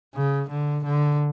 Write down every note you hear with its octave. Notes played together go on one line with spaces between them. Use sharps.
C#3
D3
D3